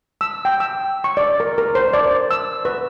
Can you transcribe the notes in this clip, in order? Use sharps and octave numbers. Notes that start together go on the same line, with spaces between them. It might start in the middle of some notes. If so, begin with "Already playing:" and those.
E6
G5
E6
C#6
D5
A#4
A#4
C5
D5
E6
B4